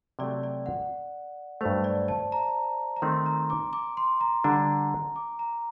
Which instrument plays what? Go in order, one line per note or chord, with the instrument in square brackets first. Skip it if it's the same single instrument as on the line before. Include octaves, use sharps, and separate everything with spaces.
[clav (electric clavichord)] C3 F#3 A3 [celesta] D5
[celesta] D5
F#5
[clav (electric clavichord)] G2 F#3 A3 [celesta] C5
[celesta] D5
A5
A#5
A#5
[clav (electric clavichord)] D#3 A3 C4 D#4 [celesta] C6
[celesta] A#5
D6
D6
C6
A#5
[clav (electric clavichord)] D3 G3 D4 [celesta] A#5
[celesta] D6
A#5